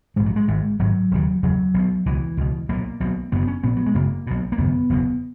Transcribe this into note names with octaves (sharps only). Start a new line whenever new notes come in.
A#1 G#2 G#3
F#3
G#3
G#1 G#2
G#1 G#2 F#3
E1 D#2 C#3
F#1 E2 C#3 F#3
B1 B2
C#2 B2 E3
C#2 B2
B1 A#2 A#3
B1 B2
F#1 F#2 C#3 B3
C#4
A#1 A#2 B3
F#3
G#3
F#1 F#2 C#3 A#3
B1 B2
A#3
G#1 F#2 C#3 B3
F#1 E2 B2